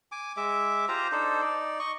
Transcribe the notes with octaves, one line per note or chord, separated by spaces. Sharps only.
G#5 D6
G#3 E5 D6
F4 G4 C5 A#5
D4 D#4 A4 C5
D#4 D5
D#5 C#6